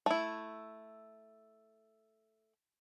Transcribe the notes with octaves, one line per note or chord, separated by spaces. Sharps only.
A3 E4